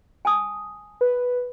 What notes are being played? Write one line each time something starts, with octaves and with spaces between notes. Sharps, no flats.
G#5 A5 D#6
B4